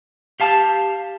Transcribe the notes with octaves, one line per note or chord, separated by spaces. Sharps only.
G4 F5 A5